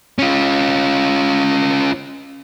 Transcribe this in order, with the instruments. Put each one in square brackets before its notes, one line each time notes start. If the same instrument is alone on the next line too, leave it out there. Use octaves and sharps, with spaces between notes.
[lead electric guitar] C#4 F4